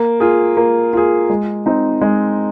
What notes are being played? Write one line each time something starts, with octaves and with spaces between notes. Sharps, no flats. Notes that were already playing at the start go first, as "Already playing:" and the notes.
Already playing: A#3
F4 G#4
A#3
F4 G#4
G#3
C4 D#4
G#3